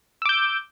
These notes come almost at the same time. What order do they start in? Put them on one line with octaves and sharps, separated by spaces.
E6 D6 G6